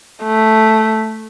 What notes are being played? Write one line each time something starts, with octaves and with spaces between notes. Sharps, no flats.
A3